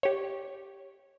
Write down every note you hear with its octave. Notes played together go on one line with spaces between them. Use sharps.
G4 C#5